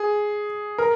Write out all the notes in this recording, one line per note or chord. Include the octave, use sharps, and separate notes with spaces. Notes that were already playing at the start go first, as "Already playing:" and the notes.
Already playing: G#4
A#4